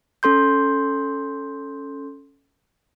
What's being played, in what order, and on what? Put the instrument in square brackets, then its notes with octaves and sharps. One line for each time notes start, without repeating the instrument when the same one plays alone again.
[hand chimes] C#4 A4 C6 G6